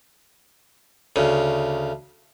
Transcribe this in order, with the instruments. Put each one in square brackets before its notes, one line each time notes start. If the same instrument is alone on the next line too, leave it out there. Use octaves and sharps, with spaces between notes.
[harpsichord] D2 C#3